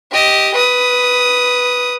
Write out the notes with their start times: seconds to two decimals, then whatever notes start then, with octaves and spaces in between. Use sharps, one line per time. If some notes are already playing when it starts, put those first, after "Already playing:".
0.12 G4 D#5
0.55 B4 D#6